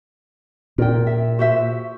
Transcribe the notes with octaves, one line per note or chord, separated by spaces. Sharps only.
A#2 A#4 G5
E5
F#4 C5 E5